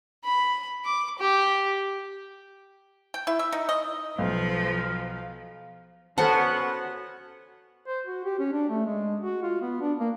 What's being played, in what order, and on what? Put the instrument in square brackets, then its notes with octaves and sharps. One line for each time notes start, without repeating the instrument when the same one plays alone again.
[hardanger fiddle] B5
D6
G4
[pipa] G5
E4
E5
D#4
D#5
[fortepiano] B1 [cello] F3 [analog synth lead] F5
[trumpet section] B3 C#4 [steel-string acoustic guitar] F#4 [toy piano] A4 A5 [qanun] C5 F#5
[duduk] C5
F#4
G4
C#4
D4
A3
G#3
F#4
F4
B3
D4
A#3